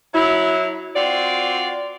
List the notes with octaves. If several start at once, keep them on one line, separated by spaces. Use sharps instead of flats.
F#3 E4
C4 F4 F#4 D5